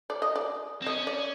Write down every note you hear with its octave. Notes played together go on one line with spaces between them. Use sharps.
D5
D#5
D5
C4
C#4 D#5
D5